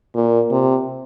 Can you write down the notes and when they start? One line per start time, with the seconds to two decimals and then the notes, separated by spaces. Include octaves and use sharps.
0.15 A#2
0.51 C3